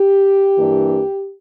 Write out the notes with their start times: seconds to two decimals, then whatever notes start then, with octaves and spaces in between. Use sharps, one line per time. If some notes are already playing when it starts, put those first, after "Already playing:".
Already playing: G4
0.56 G2 E3 A#3 D4